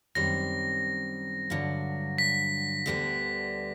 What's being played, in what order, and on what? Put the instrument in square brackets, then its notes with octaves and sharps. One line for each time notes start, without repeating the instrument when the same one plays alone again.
[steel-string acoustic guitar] F#2 D#3 G3 C4 [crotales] A#6
[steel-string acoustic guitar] G2 D3 F#3
[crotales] B6
[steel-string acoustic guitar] D2 D3 G3 B3